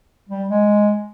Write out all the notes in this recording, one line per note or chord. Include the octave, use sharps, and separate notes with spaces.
G3
G#3